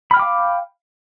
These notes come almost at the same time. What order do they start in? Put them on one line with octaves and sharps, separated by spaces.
B5 F6 G5 D6 F5